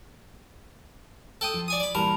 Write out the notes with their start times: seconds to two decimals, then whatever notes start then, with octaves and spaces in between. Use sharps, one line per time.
1.41 A4 G5 D#6
1.54 F3
1.68 D5 G#5 D#6
1.80 D5 B5
1.95 A#2 E3 G3 A#4 A5 B5 F7